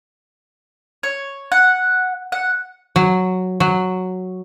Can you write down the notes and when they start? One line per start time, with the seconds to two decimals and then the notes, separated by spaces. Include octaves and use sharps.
1.03 C#5
1.52 F#5
2.32 F#5
2.96 F#3
3.60 F#3